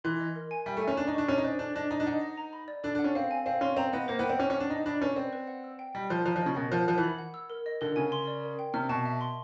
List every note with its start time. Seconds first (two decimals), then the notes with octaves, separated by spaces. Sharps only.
0.04 E3 C6
0.20 D#5
0.36 A#4
0.51 G#5
0.66 G3 E5
0.77 A3
0.82 G#5
0.87 C#4
0.97 D4 E5
1.07 D#4
1.13 D4 C#6
1.28 C#4 G#5
1.38 D#4
1.44 D4 C5
1.59 D4 A4
1.75 D4 D#5
1.91 D#4 D#5
2.00 D4
2.06 D#4 F#5
2.21 D#5
2.37 A#5
2.53 B5
2.68 D5
2.84 D4 A4
2.95 D4
2.99 F#5
3.04 C#4
3.15 C4 F5
3.31 G#5
3.46 C4 F5
3.61 C#4 C6
3.77 C4 A#5
3.93 B3 D#5
4.08 A#3 C5
4.19 B3
4.23 G5
4.29 C4
4.39 C#4 D6
4.50 C#4
4.55 F#5
4.60 D4
4.70 D#4 D#5
4.86 D4 B5
5.01 C#4 B4
5.16 C4 D5
5.33 B4
5.47 F#5
5.64 E6
5.79 G5
5.95 G3 D#5
6.10 F3 C6
6.25 F3 A#5
6.36 F3
6.42 C#3 D#5
6.56 B2 A#4
6.72 F3 F#5
6.88 F3 F#5
6.98 E3
7.03 B5
7.19 F#5
7.34 E6
7.50 A#4
7.66 D#5
7.81 D3 A#4
7.96 C#3 G#5
8.12 C6
8.27 D5
8.43 A#4
8.59 G5
8.74 C3 F6
8.89 B2 A5
9.05 E5
9.21 C6